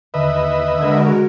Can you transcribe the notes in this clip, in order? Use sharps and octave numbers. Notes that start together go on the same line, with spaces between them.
D#2 D3 B4 D#5 E5
D3 G#3 F#4 A#4 E6 G#6